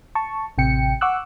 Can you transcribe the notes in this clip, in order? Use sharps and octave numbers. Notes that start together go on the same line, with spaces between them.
A5 C#6
A1 C3 G5 C#7
F#5 C#6 D6 E6 F#6